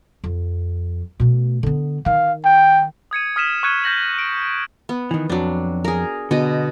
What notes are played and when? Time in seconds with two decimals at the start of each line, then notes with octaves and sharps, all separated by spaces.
0.24 F2
1.20 B2 A3
1.63 D3 B3
2.06 D#3 F5
2.45 G5
3.11 D#6 G#6 C#7 D#7
3.36 D#6 F6 B6 D#7 E7
3.63 C#6 F6 F#6 G#6 C#7 D#7
3.84 F6 G6 A#6 F#7
4.19 D7
4.89 B3
5.11 D#3 E3
5.29 F2 F#3 D4
5.84 G#4 A#4
6.31 B2 D3 D#5